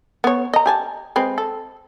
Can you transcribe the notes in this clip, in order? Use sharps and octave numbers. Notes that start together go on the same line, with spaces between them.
B3 C#5
D#5 A#5
G4 G#5 A5
G#3 C4 B4
A4